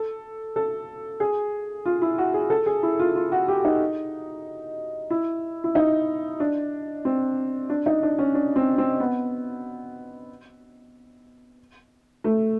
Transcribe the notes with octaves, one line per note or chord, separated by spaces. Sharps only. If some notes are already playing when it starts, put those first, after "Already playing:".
Already playing: A4
A4
G#4
F4
E4
F#4
G#4
A4
G#4
E4
F4
F4
F#4
G4
D#4
E4
E4
D#4
D4
C4
D4
D#4
D4
C#4
D4
C4
C4
B3
A3